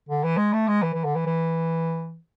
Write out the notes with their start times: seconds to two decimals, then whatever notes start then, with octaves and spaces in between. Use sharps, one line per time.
0.09 D3
0.24 E3
0.37 G#3
0.53 A3
0.68 G#3
0.82 E3
0.93 E3
1.04 D3
1.16 E3
1.26 E3